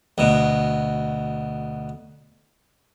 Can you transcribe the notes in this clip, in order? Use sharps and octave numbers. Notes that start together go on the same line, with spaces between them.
D2 B2